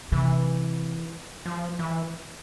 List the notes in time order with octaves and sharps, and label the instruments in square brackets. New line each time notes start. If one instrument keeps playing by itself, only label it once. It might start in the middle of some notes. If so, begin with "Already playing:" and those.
[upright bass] C3 [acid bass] E3
[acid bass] F3
E3